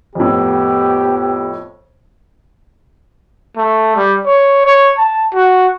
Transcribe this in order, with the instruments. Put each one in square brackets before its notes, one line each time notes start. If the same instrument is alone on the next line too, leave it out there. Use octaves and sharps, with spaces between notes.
[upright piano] F2 A2 [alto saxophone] B3 [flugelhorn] G4
[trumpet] A3
G3
C#5
C#5
A5
F#4